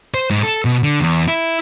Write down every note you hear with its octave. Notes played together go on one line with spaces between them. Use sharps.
C5
G#2
A4
B2
D3
E2
E4